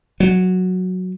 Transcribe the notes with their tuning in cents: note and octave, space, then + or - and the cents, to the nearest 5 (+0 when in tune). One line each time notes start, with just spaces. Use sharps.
F#3 -5